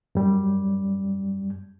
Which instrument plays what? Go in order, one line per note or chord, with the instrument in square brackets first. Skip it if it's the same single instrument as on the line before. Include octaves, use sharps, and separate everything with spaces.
[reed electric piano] F#2 G3